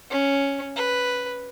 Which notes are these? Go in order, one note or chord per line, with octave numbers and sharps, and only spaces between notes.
C#4
B4